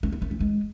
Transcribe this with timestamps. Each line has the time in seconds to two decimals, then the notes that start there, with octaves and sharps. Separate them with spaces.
0.03 A3
0.12 B3
0.22 A3
0.31 E3
0.40 G#3